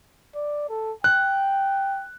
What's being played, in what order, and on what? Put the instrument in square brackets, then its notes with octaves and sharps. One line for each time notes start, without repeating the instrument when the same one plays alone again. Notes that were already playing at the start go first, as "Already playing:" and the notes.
[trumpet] D5
A4
[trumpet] G5 [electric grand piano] F#6